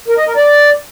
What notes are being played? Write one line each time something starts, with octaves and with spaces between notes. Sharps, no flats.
A#4
D#5
A#4
D5